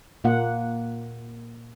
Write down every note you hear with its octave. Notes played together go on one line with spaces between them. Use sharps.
A#2 A#3 F#5